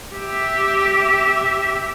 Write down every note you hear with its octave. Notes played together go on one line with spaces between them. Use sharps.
G4 E5